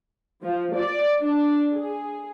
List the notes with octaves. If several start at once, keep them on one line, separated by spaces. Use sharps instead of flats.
F3
D5
D4
G#4